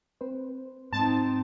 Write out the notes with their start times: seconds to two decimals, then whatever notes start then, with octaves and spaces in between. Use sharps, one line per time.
0.21 C4 B4 C5
0.93 G#2 C4 D#4 A5